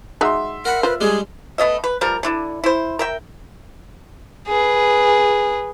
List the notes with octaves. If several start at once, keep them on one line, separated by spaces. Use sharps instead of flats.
G#3 D#4 F#4 E5 C6
A#4 F#5 B5
F4 B4 C5
G3 G#3 D4 G#4
A3 B3 D#5 E5
B4
F3 G3 A#4
D3 D4 E4
E4 C5
A#4 E5 G5
G#4 B4